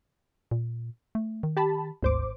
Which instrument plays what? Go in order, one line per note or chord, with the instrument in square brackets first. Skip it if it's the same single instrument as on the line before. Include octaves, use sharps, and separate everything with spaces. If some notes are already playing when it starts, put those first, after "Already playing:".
[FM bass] A#2
A3
D#3
[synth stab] G4 A5 B5
[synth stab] G#1 C5 D6 [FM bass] D2